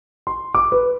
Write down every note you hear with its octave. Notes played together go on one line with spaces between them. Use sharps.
C6
D6
B4